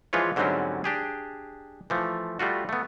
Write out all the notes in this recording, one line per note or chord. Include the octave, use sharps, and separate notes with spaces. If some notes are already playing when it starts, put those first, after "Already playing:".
E3 F3 G#3 F4 B4 C#5
G#2 D3 F#3 G3 C4 C#4
D4 G4 G#4
E3 F3 A3
G3 A3 F4 F#4
A3 B3